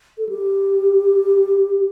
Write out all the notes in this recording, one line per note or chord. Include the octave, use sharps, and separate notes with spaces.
A4
G4